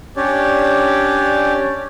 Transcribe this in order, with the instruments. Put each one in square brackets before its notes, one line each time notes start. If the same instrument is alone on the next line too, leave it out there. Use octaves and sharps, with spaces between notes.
[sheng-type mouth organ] C#4 D4 G4 C#5 D5